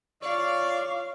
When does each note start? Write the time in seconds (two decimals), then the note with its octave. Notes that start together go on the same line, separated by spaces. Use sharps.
0.22 F4 C#5 D5 F5 C#6